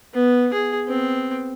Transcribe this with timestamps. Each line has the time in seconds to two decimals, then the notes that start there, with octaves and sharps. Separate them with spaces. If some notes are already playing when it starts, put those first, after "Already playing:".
0.14 B3
0.53 G#4
0.85 B3 C4